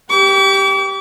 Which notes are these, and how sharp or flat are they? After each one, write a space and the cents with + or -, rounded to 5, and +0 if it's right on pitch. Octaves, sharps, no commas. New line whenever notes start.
G4 +0 D6 -45